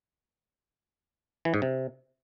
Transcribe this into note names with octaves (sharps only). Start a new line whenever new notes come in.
E3
G#2
C3